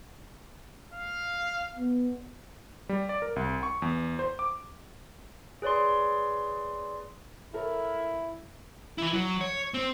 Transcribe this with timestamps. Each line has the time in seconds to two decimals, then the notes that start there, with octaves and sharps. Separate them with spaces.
0.93 F5
1.76 B3
2.89 G3
3.09 D5
3.22 A#4
3.36 C2
3.63 C#6
3.82 E2
4.19 C5
4.39 D6
5.62 G#4 B4 C#5 D5 C6
7.54 E4 A4 A#4 C#5
8.98 E3 E4
9.14 F#3
9.41 C#5
9.74 C4